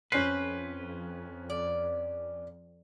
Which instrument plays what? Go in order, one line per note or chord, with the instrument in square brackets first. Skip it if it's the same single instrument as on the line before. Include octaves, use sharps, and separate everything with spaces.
[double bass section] F2 [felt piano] C#4 C7 [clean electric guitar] B4 [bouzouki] C5
[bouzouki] D5